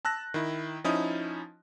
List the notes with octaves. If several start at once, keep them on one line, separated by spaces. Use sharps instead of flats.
A5 E6 F#6 A#6
D#3 E4
F3 C#4 D#4 E4 D#6